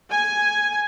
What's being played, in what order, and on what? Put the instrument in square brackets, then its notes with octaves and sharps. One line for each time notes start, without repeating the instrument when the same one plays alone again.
[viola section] G#5